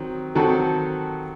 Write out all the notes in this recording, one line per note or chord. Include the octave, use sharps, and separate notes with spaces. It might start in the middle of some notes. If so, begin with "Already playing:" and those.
Already playing: D#3 F#3 C4
D#3 F#3 C4 F#4 A4